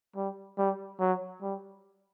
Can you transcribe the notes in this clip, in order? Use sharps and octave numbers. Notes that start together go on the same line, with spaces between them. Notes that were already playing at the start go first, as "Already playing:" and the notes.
G3
G3
F#3
G3